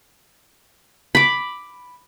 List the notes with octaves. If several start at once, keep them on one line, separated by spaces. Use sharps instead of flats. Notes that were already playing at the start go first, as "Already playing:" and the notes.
B5 D6